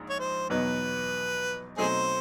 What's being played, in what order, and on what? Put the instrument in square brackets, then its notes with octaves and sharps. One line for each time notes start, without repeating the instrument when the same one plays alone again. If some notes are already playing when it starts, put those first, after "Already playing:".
Already playing: [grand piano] A#1 G#2
[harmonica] C#5
C5
[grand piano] E2 B2 F#3 B3 D#4 [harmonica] B4
[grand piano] B2 F#3 A3 C4 D#4 [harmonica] G#4 C5